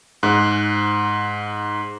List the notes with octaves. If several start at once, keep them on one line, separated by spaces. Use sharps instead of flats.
G#2 F#6